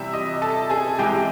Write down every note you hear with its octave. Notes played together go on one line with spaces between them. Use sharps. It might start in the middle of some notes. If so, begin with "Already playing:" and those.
Already playing: C3 E3 G3 E5
D#5 D#6
A4 A5
G#4 G#5
C3 E3 G#3 G4 G5